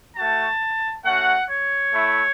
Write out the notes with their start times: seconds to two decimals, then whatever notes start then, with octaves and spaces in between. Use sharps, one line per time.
0.16 A3 F#4 A5
1.04 A3 C#4 F#4 F#5
1.49 C#5
1.93 A3 E4